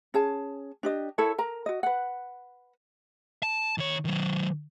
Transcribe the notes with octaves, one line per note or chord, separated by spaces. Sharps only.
C#4 G#4 A5
D4 G4 D#5
E4 A4 A#4 C#5
A#4 A#5
F#4 D#5
B4 F#5
A5
D#3 C#5
D#3 F#3